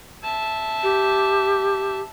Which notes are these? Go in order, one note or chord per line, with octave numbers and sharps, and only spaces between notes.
E5 A5
G4